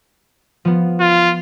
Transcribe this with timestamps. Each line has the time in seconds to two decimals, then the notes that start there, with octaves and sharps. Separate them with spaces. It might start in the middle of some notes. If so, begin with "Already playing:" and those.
0.65 F3 B3
1.00 F4